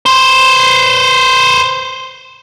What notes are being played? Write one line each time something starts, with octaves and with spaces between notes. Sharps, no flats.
B4 C5